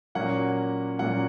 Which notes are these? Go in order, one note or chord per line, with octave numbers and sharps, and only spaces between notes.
A#2 F#3 A#3 C#4 F#5
A#2 F#3 A#3 C#4 F#5